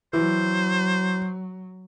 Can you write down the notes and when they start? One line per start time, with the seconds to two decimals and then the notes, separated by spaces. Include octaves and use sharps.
0.13 E3 F#3 C5